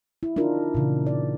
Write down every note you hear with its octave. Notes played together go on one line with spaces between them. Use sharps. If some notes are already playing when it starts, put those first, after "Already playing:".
E4
D4 D#4 F4 A#4
A#2 C#3 E3
D5